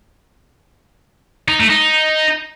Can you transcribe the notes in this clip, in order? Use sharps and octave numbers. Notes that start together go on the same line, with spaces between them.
D#4
A3
D#4